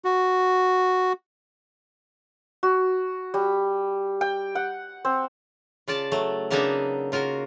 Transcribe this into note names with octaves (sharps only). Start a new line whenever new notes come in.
F#4
F#4
G3
G5
F#5
C4
C#3 F4 D5 A5
F#3 A3
C#3 A#3 B3 D4 D#4 E5
C#3 F4 F#4 A#4